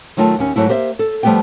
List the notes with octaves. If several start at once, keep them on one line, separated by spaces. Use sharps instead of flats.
D#3 F#3 A3 F4 G#5 A5
D#2 C#4
G#2 C#3 F#3 A3 E4
A#3 G4 C5 D#5 E5
A4
F3 G3 A3 B3 G4 G5